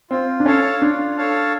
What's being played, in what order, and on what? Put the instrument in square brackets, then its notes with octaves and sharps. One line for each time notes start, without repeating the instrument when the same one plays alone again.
[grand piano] C4 [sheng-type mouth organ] F4
[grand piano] D4
[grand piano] C#4 [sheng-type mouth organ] A4 C#5 F5 A5
[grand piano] D4 [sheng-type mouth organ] F4
[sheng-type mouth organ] A4 C#5 F5 A5